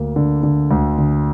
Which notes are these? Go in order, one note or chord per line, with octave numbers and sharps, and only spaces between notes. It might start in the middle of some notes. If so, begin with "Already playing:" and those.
Already playing: D2 A#3
D3
D3
D2
D3